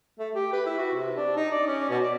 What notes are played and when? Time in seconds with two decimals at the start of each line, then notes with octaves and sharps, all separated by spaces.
0.19 A3
0.35 G4
0.52 B4
0.66 E4
0.78 F#4
0.93 C3
1.16 D4
1.36 D#4
1.51 D5
1.67 C#4
1.89 B2
2.03 D5